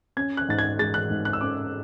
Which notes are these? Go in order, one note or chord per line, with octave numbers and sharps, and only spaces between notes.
C#4 G#6
F#6
G#2 A6
G#6
G#3 A6
F#6
G#2
F#6
E6
C#4 D6